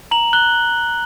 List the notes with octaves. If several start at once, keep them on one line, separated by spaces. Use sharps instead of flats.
A#5 F#7
F#6 G7